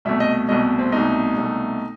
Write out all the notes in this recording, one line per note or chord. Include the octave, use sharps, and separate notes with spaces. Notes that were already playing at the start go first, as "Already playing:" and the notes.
C2 B2 A3 E5
D#5
C2 B2 A3 D#5
C4
C2 B2 A3 D#4
C2 B2 A3